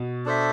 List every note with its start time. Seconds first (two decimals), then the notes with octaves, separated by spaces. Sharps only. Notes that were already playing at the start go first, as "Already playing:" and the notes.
Already playing: B2
0.26 D4 A4 C5 E5